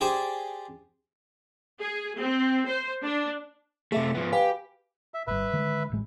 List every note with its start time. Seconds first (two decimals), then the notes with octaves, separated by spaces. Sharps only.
0.01 G4 G#4 C5 D5
1.80 G#4
2.20 C4
2.68 C5
3.03 D4
3.92 C3 A3 G#4 E5
4.15 F3 B3
4.32 G4 B4 F5 G#5
5.14 E5
5.27 G1 G2 B4 E5
5.53 D3 D#3 G#3
5.90 D1 A1 G#3